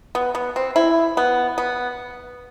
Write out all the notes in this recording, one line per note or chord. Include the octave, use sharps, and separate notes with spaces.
B3
B3
C4
E4
B3
B3